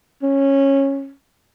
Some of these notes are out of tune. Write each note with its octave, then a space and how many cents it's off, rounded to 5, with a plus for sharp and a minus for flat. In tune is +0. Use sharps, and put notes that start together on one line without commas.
C#4 -15